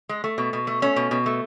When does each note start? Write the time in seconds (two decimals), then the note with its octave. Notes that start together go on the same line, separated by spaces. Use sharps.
0.09 G#3
0.24 A3
0.38 B2
0.53 B2
0.67 A3
0.82 A3 C#4
0.96 B2
1.11 B2
1.26 A3